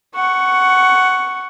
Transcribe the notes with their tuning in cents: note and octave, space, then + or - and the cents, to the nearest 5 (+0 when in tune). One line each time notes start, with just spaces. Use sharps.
F#5 +10 C#6 +0